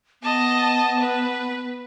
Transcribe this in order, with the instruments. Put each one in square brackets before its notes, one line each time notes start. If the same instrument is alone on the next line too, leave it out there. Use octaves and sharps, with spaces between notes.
[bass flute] B3 [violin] D#5 A5
[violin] B4